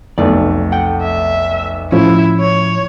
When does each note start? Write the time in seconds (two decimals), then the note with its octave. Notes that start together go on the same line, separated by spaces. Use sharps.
0.18 F1 B1 A3 D5
0.72 F#5 G5
1.03 E5
1.92 A2 F3 C#4 E4
2.40 C#5